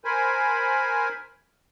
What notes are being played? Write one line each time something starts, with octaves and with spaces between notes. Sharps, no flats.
A#4 C5 G#5 B5